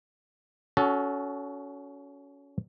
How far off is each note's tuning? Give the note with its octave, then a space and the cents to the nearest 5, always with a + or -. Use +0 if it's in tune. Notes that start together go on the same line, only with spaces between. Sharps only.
C#4 +20 F#4 +0 A4 -15